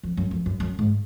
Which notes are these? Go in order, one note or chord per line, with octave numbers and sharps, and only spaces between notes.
F2
F#2
F2
F#2
F#2
G#2